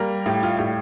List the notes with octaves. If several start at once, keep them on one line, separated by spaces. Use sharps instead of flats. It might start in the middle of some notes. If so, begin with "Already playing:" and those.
Already playing: G3 A#3 A#4
A2 G4
F4
A2 G4